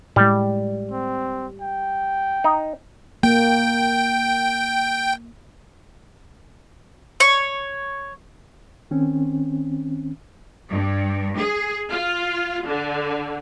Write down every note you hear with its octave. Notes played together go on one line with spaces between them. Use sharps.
A2 G3 G#3
C4
G5
D#4
A#3 G5
C#5 C#6
D#3 C4 C#4
G2
G#4
F4
D3